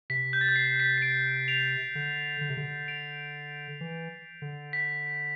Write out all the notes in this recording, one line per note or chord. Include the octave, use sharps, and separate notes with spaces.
C3 B6
G6
A6
G6
C7
B6
C7
B6 D7
D7 F7
D3
D3
C3
D3
D7 F7
E3
D3
B6